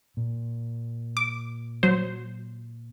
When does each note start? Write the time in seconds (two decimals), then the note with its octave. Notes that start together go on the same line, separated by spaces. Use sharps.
0.17 A#2
1.17 D6
1.83 F#3 C5